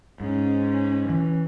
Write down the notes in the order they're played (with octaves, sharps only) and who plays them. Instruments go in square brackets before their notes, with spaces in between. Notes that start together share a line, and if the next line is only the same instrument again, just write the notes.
[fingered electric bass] G#2 [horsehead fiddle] C#4
[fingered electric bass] E3